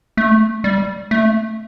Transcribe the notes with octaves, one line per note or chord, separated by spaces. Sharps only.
A3
G3
A3